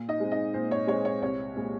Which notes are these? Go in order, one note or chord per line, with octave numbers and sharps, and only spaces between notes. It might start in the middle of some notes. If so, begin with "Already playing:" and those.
Already playing: A#2
D#4 D#5
G#3 C4
D#4 D#5
A#2 C5
C#5
G#3 C4 C#5
C#5
C2 C#5
A#2 G#3 C4